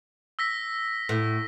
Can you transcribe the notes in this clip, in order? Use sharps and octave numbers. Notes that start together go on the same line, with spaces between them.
E6 A#6 B6
A2